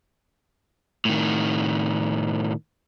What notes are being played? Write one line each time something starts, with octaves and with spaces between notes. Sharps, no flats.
A2 D#3